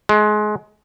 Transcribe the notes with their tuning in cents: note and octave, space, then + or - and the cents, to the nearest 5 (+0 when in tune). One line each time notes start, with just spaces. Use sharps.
G#3 +25